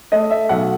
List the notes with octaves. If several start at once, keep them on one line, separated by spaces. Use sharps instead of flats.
A3 D#5
E5
B1 F#5